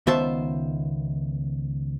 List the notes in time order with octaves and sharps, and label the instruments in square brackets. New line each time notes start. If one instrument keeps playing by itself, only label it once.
[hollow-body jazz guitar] C#2 D#3 B3 C5 E5 A5